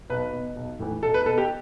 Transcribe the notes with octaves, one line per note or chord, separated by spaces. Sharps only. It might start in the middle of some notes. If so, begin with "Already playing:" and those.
B1 B4
B2
B1
A2 E3
B1 A4
B4
B2 A4
G4